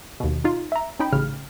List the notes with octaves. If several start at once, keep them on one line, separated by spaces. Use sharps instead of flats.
D#2 B2
D#4 F4
E5 A#5
C#4 D#4 G5 B5
A1 C#3 F6